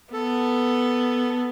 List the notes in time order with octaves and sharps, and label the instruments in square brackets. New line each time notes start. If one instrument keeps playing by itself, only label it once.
[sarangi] B3 [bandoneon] A4